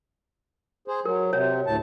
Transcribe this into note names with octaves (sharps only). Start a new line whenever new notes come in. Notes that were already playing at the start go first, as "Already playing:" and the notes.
G#4 C5
F#3 A#4
C3 C#5
D2 A2 A5